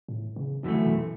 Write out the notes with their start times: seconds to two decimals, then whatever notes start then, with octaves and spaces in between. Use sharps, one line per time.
0.08 A2
0.36 C#3
0.63 F#2 D3 E3 A3
0.85 B2